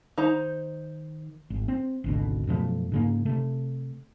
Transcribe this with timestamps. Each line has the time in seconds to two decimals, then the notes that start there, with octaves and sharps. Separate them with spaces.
0.18 D#3 D#4 C5 A#5
1.50 G#1
1.68 C4
2.04 G#1 D2 B2
2.47 F#2 B2 F3 A3
2.92 G#2 C#3 A#3
3.25 C3 A3